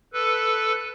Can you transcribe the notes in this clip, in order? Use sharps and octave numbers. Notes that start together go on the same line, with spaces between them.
A4 B4